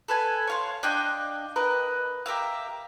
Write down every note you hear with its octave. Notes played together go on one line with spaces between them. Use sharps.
A4 B4 G#5
C#5 F5 C6
D4 D#5 F5 G5
A#4 B4 D#5
G4 A#4 E5 F5